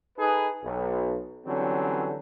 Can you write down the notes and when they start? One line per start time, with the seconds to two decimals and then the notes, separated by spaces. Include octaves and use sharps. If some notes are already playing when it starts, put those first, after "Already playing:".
0.17 D#4 G#4 A4 B4
0.63 B1
1.46 D3 E3 F#3 G3 C4 C#4